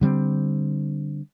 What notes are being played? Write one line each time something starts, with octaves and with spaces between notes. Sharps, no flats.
D3 G3 B3 C4